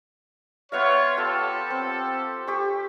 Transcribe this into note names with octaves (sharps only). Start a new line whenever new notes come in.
B3 F4 C#5 E5 F5
F4 G4 A4
C4
G4 C#6